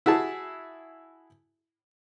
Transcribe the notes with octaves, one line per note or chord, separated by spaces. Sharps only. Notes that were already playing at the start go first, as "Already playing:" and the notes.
E4 F#4 G#4 A5